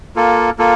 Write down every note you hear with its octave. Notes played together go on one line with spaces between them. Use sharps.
A#3 F4 A4
A#3 F4 A4